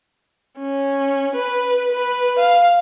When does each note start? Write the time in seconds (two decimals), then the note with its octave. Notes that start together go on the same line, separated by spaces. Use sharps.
0.59 C#4
1.36 B4
1.92 B4
2.39 F5